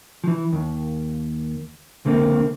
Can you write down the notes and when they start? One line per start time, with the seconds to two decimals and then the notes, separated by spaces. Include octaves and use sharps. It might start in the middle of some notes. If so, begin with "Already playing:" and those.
0.24 E3 F3
0.53 D#2
2.05 C#2 D3 A#3 C4